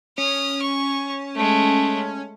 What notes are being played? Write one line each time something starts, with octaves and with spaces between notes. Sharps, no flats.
C#4 D#6 F6
C#6
G#3 A3